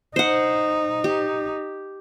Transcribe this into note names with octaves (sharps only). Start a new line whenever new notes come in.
D#4 C5 F#5
G4